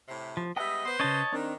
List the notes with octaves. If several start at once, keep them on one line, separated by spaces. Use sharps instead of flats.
A2 C3
F3
G3 G#3 B3 D#5 E5 F#5
B3 B4 C5
C#3 C#4 C#5 D#5 A5
D#3 C4 D4